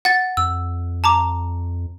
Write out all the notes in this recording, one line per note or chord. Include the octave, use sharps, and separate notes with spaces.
F#5 A6
F2 E6
A5 A#5 D6